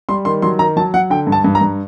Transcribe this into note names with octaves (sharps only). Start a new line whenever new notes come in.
G3 C6
D#3 C6
F#3 C6
D#3 A#5
F#3 A5
F#3 F#5
D3 G5
G2
A5
G2
A#5
G2